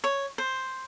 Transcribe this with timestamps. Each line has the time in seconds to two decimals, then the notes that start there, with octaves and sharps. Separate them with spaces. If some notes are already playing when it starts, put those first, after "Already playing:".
0.04 C#5
0.38 C5